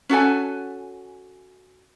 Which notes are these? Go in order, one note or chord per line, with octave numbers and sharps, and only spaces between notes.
C#4 F#4 A4 G#5